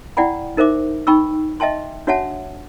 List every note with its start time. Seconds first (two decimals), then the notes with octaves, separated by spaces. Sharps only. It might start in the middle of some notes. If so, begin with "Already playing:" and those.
0.17 E4 D5 F#5 G5 B5
0.57 D#4 A#4 C5 E5 D6
1.07 D#4 G5 B5 C#6 E6
1.60 D#5 E5 G5 A5 C6
2.07 D4 F#4 C#5 E5 F#5 A5